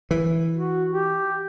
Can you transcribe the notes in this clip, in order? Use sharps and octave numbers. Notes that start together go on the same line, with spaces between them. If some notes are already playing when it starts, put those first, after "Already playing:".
E3
F#4
G4